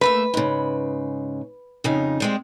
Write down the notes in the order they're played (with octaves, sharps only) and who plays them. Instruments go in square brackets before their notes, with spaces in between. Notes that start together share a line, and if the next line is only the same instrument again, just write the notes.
[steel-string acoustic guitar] A3 A#3 E5 [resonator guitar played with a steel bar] B4
[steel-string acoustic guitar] G#2 C#3
F2 C#3 D#4
G3 G#3 C4